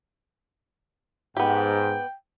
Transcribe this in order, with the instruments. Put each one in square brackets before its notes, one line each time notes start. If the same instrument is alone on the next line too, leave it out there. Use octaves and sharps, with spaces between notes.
[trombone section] G#2 [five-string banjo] B3 G4 [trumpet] G5